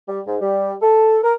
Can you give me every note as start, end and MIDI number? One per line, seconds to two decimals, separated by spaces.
0.08 0.20 55
0.27 0.35 44
0.41 0.74 55
0.82 1.18 69
1.23 1.34 70